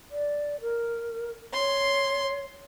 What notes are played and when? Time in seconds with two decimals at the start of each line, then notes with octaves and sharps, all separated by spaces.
0.11 D5
0.61 A#4
1.53 C#5 C6